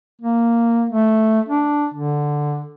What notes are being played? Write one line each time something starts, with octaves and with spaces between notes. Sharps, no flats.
A#3
A3
D4
D3